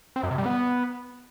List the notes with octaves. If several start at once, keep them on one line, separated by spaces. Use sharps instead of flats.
C4
F#2
C3
G3
B3